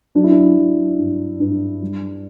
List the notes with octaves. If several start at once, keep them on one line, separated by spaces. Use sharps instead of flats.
F#3 D4
E4
D4
F#3
G2
G2
G3